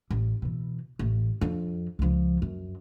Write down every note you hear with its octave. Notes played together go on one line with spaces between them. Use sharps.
A1
B2 E3
A1
F2 D4
C#2 F3
F#2